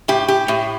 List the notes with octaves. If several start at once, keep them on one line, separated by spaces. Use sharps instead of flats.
A2 G4
G4
A2